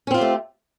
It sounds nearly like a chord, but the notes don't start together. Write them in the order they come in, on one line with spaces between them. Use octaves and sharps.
C#4 C4 F4 G4 A3